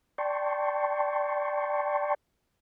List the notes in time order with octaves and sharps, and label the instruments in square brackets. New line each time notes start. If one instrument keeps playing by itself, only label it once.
[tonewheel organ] D5 G5 A5 C6 C#6